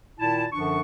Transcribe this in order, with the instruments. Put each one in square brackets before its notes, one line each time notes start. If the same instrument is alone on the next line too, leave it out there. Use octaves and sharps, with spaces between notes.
[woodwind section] A#2 D#3 E4 A5
F#2 D3 F3 D4 C#6